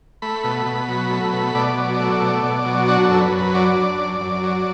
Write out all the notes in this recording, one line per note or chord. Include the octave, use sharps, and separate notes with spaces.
A3 B5
B2
B2
F#3
A3
B2
B2 D5
F#3
A3
B2
B2
F#3
D4 F#4
F#2 A4
B4
F#2
B4
F#3 D5
D4
F#2
F#2
F#3